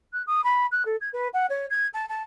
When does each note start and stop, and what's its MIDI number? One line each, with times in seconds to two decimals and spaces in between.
0.13 0.22 90
0.27 0.43 87
0.44 0.66 83
0.71 0.83 90
0.85 0.96 69
1.01 1.09 92
1.13 1.28 71
1.33 1.46 78
1.49 1.66 73
1.70 1.87 92
1.93 2.07 81
2.09 2.22 81